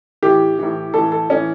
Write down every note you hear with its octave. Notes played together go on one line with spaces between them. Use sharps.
A2 E3 G4
A2 E3
A2 E3 A4
A4
A2 E3 C#4